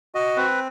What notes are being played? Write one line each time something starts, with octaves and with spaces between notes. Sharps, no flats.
F#4 D#5
C4 B4